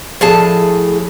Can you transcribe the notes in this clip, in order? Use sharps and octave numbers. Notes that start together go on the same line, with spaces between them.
A2 F3 G#4 A4 A5